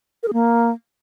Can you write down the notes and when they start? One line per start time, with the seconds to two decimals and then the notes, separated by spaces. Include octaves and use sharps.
0.23 A#4
0.28 G#4
0.33 A#3